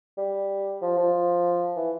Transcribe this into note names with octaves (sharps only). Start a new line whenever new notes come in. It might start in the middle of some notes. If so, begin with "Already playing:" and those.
G3
F3
F3
E3